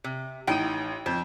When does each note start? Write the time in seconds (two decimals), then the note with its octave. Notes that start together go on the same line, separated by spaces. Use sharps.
0.04 C3
0.47 A1 D#4 G5 D#7
1.06 F2 C5